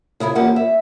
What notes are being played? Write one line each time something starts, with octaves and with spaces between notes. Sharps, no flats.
C#3 E4 G#4 A#4
E2 F3 A#3 C#4 G4 F#5
E5